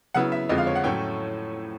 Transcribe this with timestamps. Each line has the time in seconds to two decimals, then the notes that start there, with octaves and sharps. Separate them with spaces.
0.14 C#3 F#3 B3 E4 F#5
0.32 E5
0.49 F2 D3 F3 G#3 D#5
0.58 F5
0.67 C#5
0.76 F#5
0.84 A2 F#3 A3 C#4 E4 G5